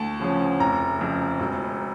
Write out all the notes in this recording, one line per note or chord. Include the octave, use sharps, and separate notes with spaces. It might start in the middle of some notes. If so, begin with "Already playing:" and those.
Already playing: D2 A5
C#3 F3 C#4
F1 A#5
F2 C#3
E1